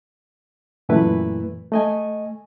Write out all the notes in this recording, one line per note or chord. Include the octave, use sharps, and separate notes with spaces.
F#2 A#2 E3 A3 E4 B4
A3 D#5 G#5